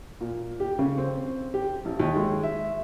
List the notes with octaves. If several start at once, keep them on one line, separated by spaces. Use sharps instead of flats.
A#2
G4
C#3
C4
G4
A1
D#2
G#3
E5